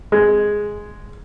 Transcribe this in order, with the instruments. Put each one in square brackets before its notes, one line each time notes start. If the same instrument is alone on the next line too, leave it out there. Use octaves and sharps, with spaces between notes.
[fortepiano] G#3